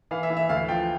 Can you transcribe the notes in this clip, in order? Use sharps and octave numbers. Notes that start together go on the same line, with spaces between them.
E3 F5
E5
E3
E5
D2 F5
F3 G5